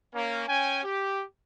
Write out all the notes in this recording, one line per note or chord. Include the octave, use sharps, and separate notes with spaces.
A#3 C#4
C#4 G5 G#5
G4